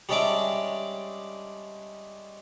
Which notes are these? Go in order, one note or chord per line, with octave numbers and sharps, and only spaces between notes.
G3 G#3 C#4 D4 E5 D6